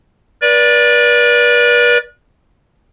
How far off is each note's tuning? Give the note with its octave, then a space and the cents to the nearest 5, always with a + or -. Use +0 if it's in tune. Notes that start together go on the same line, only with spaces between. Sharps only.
B4 -40 D5 -5